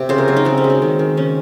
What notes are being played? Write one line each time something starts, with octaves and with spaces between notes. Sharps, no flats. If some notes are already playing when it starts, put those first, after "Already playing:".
Already playing: C3
C#3 C5
A#4
F#3 F#4
D#4
C#3 C4
C#4
G#3
C4
D#3
D#3
C#3 C#4